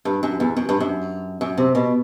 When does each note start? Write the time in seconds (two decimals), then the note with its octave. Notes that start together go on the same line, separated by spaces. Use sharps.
0.05 G2
0.23 F#2
0.40 E2
0.57 F#2
0.69 G2
0.80 F#2
1.41 F#2
1.58 C3
1.75 B2